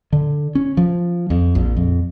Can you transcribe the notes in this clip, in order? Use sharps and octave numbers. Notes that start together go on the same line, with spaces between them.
D3
C#4
F3
F2
A#1
F2